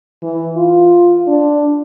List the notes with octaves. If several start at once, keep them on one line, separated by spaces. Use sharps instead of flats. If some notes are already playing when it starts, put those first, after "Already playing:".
E3
F4
D4